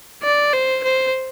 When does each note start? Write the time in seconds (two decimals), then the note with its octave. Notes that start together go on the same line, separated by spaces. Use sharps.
0.23 D5
0.53 C5
0.84 C5